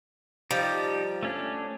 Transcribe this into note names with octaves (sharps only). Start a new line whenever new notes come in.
F3 G3 D#4 G4
A3 C#4 D4